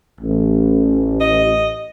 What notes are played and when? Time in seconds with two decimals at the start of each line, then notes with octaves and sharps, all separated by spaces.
0.20 A1
1.20 D#5